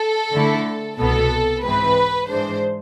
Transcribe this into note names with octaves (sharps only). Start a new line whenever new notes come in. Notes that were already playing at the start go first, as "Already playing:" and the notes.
Already playing: A4
D3 A3 E4
C2 B2 B3 A4
G#2 E3 G#3 C4 B4
G#2 E3 G#3 D4 C5